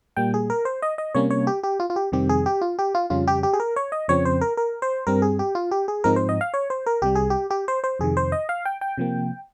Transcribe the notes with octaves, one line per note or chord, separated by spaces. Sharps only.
A#2 G3 A#3 G5
G#4
A#4
C5
D#5
D#5
C3 G3 A#3 C#4 C#5
C#5
G4
G4
F4
F4
G4
F2 C3 D#3 G3 C4 G4
G#4
G4
F4
G4
F4
F2 C#3 G3 C#4 F4
G4
G4
G#4
A#4
C#5
D#5
F2 C#3 F3 C4 C#5
C5
A#4
A#4
C5
G2 G3 C4 A#4
G#4
G4
F4
G4
G#4
G#2 F3 G#3 C4 D#4 A#4
C5
D#5
F5
C#5
C5
A#4
C2 C3 G3 G4
G#4
G4
G4
C5
C5
F2 C3 D#3 G#4
C5
D#5
F5
G5
G5
C3 F3 A#3